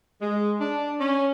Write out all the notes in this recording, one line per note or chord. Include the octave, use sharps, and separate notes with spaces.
G#3
D4
C#4